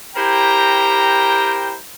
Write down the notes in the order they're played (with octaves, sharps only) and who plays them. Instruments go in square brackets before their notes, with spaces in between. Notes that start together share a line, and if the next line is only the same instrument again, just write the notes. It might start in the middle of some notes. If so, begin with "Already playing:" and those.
[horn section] E4 G4 A#4 C5 G5 A#5